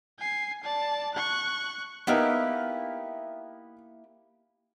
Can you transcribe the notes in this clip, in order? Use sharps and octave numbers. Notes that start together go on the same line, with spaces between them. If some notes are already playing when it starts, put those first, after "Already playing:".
G#5 C7
D5 A5
C#6 F#6
A#3 B3 D#4 E4 G4 A#4